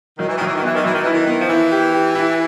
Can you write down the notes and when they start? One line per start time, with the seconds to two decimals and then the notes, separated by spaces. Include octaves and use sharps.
0.19 D#3 F#3
0.29 E3
0.37 D#3 F#3
0.46 E3
0.56 D#3
0.62 E3 B3
0.75 D#3
0.84 E3 F#3
0.94 D#3
1.03 E3 E4
1.12 D#3
1.27 B3
1.41 F3
1.49 E3 E4
1.71 G4
1.93 G4
2.15 E4